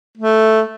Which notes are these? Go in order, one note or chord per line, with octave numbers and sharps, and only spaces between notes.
A3